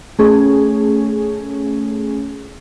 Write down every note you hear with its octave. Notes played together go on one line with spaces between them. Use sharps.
A3 C#4 G#4